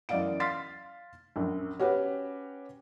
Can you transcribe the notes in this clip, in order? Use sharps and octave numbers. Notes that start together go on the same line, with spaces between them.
F#2 E3 D5 D#5 F5 D7
F5 C6 F6 A6 B6 C7
A#1 F#2
C#4 F#4 G4 B4